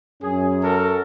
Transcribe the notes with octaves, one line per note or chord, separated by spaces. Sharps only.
F#2 C#4 G#4
F#4 A4 A#4